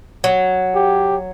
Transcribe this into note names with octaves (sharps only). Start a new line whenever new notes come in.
F#3
G4